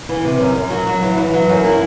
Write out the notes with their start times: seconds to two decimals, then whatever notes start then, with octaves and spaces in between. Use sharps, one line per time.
0.09 E3
0.25 C3
0.40 F#2
0.55 F#2
0.70 F#3
0.87 F#3
1.03 E3
1.18 E3
1.34 F#3
1.49 F#2
1.64 E4